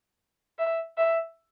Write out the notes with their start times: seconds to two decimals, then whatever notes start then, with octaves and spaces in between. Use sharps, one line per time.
0.59 E5
0.98 E5